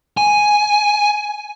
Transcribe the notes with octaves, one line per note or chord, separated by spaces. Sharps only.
G#5